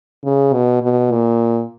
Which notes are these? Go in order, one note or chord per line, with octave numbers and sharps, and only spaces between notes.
C#3
B2
B2
A#2